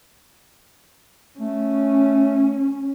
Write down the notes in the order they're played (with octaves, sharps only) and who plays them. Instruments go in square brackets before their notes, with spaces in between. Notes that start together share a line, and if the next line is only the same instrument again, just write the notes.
[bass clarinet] A3 [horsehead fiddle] C#4